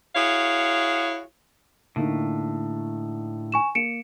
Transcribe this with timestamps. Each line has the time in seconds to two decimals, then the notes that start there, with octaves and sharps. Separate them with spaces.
0.16 E4 F#4 G#4 C#5 F5
1.96 A2 D3 A#3 D#4
3.52 G#5 C#6 E7
3.75 A#3 C#7 D7 E7